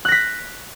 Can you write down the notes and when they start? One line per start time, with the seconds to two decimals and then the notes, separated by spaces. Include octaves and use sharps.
0.05 F#6
0.08 A#6
0.12 B6